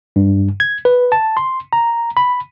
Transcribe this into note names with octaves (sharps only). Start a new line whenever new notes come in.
G2
G#6
B4
A5
C6
A#5
B5